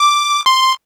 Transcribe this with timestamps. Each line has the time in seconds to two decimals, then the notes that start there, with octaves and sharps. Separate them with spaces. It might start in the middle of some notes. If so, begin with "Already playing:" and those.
Already playing: D6
0.46 C6